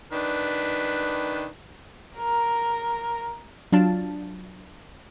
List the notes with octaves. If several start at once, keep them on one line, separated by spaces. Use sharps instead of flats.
D#3 D4 B4
A#4
F#3 D4 F4 F5 A5